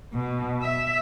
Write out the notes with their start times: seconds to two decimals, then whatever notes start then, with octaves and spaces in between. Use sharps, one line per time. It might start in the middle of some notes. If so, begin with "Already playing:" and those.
0.14 B2
0.62 E5